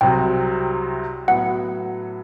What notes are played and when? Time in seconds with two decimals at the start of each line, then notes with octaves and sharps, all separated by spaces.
0.01 C2 C3 F#3 G5
1.28 A2 F#3 B3 F#5